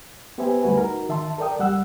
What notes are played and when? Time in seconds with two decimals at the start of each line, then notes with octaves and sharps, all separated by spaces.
0.38 B3 G4 B4 C5 E5 G#5
0.63 D2 G3 A3 F#4 B4 G#5
0.78 D#4 F#4 A#4
1.09 D#3 E5 A5 C6
1.38 A4 A#4 D5 G5 D#6
1.58 C#2 G3 F#5 E6 F#6